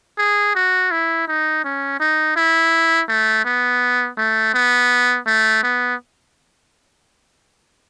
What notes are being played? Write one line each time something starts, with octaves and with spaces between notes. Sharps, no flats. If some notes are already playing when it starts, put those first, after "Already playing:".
G#4
F#4
E4
D#4
C#4
D#4
E4
A3
B3
A3
B3
A3
B3